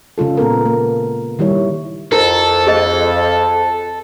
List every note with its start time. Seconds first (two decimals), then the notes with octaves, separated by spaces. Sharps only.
0.18 C#3 G#3 F4 A4
0.37 A#2 B3 A4 A#4
0.66 A#3
1.39 D#3 G3 E4 C#5
2.12 F2 E4 A4 A#4
2.67 G#4 D#5